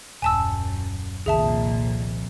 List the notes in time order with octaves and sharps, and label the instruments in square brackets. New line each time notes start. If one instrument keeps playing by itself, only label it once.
[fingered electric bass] D#1 [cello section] F#2 [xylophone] G#5 A5 E6
[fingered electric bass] F1 C2 D#3 [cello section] F2 A#2 [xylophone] G#4 E5 A5